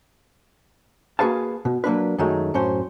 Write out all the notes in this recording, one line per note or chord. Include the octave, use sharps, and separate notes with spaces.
A#3 F#4 G#4 B4 F5 A5
B2
F#3 A#3 D4 B4
F#2 D#3 F#3 G#3 A3
F#2 A2 C#4 C5